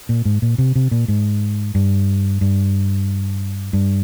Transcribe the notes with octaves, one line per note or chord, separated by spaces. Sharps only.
A#2
G#2
A#2
C3
C3
A#2
G#2
G2
G2
G2